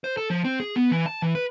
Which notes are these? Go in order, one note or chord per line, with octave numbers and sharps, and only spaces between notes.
C5
A4
F3
C4
G#4
B3
E3
A5
E3
B4